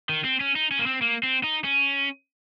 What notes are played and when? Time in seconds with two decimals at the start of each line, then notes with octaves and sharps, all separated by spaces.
0.09 D#3
0.24 C4
0.41 C#4
0.56 D#4
0.71 C#4
0.79 A#3
0.86 C4
1.01 A#3
1.23 C4
1.44 D#4
1.64 C#4